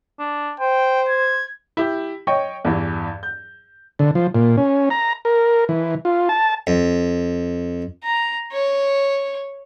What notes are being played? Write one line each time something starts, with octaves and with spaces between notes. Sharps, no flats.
D4
C5 G5
G#6
E4 G4
C#5 D#5 G5 C#6
E2 G2 E3
G6
D3
F3
A#2
C#4
A#5
A#4
E3
F4
A5
F2
A#5
C#5